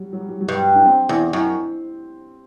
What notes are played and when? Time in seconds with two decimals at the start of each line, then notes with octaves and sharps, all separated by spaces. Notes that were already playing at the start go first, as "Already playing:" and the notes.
Already playing: F#3 G3
0.13 F#3
0.21 G3
0.29 F#3
0.41 F#3
0.49 G2 G3
0.75 D4
0.85 C4
1.09 E2
1.33 F#2